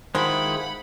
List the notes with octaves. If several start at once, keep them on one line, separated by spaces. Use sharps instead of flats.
D#3 G#3 E4 F4 G#4 C5 F#5 B5